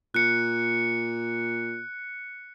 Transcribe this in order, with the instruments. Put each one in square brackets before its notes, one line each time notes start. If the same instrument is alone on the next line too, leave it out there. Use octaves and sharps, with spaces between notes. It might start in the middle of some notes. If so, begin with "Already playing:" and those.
[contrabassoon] A#2 [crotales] F#6 C#7